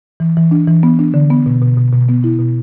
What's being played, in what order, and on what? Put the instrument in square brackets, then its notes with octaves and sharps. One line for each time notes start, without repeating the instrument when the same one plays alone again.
[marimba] E3
E3
D4
E3
B3
D4
D3
B3
B2
B2
B2
B2
B3
E4
B2